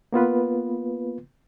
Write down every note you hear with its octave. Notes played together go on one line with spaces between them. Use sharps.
A#3 B3 F4 B4